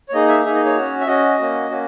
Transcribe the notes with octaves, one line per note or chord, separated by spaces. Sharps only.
C#5
A#3 D#4 G#4 D#5
E5
A#3 D#4 G#4 E5
D#5
C#5
C#4 F#4
E5
C#4 F#4 D#5
A#3 C#4 F#4
A#3 C#4 F#4